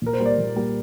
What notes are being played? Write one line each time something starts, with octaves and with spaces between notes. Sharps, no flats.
A#2 A#4
C5
G3 A#3
D5
A#2
G3 A#3